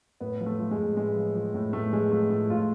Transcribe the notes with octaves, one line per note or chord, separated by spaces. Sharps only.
A2 B3
F3
A3
F3
G#3
A2
A2 G#3
F3
F3
A2
A2 A3
F3 G#3
F3 A3
A2 A3
A2 F4